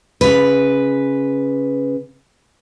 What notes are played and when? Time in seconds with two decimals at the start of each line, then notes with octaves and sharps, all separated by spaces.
0.21 C#3 B4